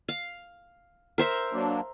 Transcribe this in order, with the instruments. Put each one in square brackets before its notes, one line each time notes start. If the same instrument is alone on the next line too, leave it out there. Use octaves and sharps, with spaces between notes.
[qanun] F5
A#4 C5 E5
[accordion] F#3 A#3 D4